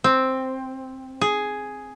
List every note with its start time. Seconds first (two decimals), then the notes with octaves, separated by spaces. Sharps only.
0.04 C4
1.21 G#4